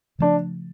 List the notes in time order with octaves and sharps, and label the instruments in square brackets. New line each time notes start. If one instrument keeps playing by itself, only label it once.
[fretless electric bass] C#3 F3 A3 [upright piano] D4